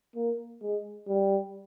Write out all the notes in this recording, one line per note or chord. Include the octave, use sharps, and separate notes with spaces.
A#3
G#3
G3